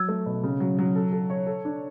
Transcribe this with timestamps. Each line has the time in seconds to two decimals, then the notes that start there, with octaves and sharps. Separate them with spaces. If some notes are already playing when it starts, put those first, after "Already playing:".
Already playing: F#3 E6 G#6
0.08 A3
0.26 B2
0.43 C#3
0.60 F#3
0.78 F#3
0.96 A4
1.12 A4
1.30 C#5
1.47 A4
1.65 D4